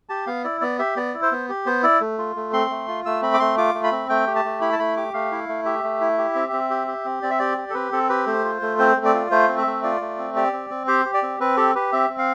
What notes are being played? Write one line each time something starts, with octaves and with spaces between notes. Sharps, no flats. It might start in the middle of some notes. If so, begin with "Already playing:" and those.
G4 A5
B3 F5
E4 D5
B3 D5
G4 E5
B3 D5
E4
C5
B3
G4
B3 C5
E4 D5
A3
F4
A3
C4 C6
A3
F4
A3 E6
C4 B5
D6
A3 C6
F4 D6
A3
B5
C4
A3 G5
G4
A5
A3
E4 B5
A5
A3 B5
G4 D6
A3 F5
E4
A3
G4 E5
A3
E4
G4
C4
C4
G4
G4
C4
C4 D5
E5
G4 D5
G4
A4
C4 B4
C4 A4
G4 B4
A3 C5
F4
A3
C4 C5
A3
D5
F4
A3 C5
C4
E5
A3
F4 D5
A3
C4
G4 D5
C4
C4
G4 C5
G4
D5
C4
C4 B4
G4 A4
G4 B4
C4 E5
C4
F5